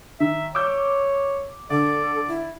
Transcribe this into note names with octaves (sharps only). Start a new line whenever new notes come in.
D#3 E5
C#5 D6 E6 G6
D3 A4 D5
E4